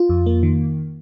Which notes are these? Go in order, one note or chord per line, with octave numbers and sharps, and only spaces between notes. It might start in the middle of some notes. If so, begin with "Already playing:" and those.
Already playing: F4
F2
A#3
D#3